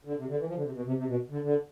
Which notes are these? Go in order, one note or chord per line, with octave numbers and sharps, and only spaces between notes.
D3
C3
D3
E3
F3
D3
C3
B2
C3
C3
B2
D3
D3